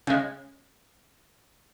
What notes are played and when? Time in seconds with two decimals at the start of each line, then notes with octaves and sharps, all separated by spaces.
0.07 C#3 G#3